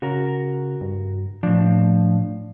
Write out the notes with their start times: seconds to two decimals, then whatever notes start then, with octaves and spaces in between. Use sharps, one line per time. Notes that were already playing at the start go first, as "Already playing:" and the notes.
0.02 C#3 F#4 A#4
0.81 G2
1.43 A2 F3 D4